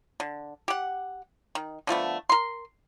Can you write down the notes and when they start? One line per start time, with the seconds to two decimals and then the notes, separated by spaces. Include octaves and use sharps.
0.20 D3
0.68 G4 F#5
1.55 D#3
1.87 D3 F3 A3 B3
2.29 A#4 C6